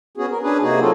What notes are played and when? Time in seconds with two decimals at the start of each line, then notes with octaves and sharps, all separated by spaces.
0.17 B3 C#4 F#4 G#4
0.31 A#4
0.43 C#4 D4 G#4 B4
0.62 C3 A#3 D#4 F#4 G#4
0.80 F#3 C4 F4 F#4 A4